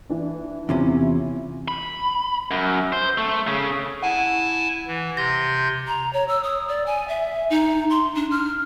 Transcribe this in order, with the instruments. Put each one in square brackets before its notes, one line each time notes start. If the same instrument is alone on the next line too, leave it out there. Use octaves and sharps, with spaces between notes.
[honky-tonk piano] E3 D4
[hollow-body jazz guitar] E2 C3 C#4 [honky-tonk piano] E4 F4
[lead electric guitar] B5
F#2
C5
A3
C#3
[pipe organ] E4 G#5 A5 [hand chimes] F#5
[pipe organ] E3
[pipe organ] C3 C6 G6 [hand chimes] A#6
[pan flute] A#5
C#5
E6
D#6
D5
G#5
E5
D#4
C6
D4
F6